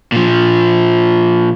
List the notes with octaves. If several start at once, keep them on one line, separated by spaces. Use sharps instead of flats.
A#2 F3